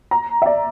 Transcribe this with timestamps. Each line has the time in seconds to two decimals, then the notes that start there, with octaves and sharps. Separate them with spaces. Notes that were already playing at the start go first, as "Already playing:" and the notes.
0.11 A#5
0.42 E5
0.46 D5